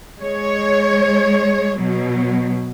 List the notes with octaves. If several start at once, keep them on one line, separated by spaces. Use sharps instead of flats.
G#3 C#5
B2 F#3